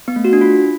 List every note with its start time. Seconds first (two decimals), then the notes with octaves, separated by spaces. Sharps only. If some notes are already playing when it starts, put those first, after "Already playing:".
0.08 B3
0.16 A3
0.25 F#4
0.33 D4
0.41 F4